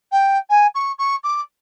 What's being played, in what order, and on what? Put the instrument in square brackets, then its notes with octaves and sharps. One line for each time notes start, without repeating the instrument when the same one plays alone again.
[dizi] G5
G#5
C#6
C#6
D6